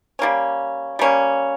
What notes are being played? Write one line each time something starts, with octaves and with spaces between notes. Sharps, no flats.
G3 A#3 C#4
G3 A#3 C#4